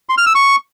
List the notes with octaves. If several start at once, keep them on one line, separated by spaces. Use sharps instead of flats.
C6
F6
E6
C#6